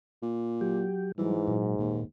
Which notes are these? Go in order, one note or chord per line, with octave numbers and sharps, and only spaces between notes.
A#2
F#3 G4
G#2 E3 F#3 G3
A#2 F#3
D#2 A#2